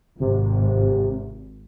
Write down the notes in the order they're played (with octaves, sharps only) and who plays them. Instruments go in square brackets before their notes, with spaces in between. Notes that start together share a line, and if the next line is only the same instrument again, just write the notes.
[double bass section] G#1 [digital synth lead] C3